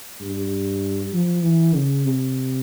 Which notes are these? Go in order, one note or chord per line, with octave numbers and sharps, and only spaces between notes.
G2
F3
E3
C#3
C3